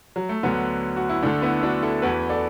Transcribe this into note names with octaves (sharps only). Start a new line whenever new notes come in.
F#3
A3
D2 D3 F#3 B3
F#4
E4
D2 D3 A3 D4
B3 E4
D4 F#4
E4 A4
E2 E3 F#4 B4
A4 D5